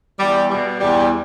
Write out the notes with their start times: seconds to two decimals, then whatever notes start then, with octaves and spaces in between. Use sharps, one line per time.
0.19 E2 G3
0.50 B2 G3
0.80 E2 G3